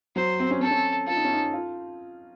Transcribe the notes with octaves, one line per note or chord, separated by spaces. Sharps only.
F#3 C5
C4
C#4
C4 A4
C#4
F4 A4
D#4
C#4
D#4
F4